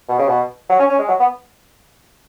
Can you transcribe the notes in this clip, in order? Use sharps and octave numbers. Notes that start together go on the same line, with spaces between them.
B2
C#3
B2
F#3
C#4
C#4
G#3
F#3
B3